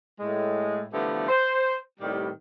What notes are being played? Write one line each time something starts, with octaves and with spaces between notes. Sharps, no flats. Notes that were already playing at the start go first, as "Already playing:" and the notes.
A2 G#3
D3 E3 F3 G3 A3 B3
C5
A2 C3 D#3 G3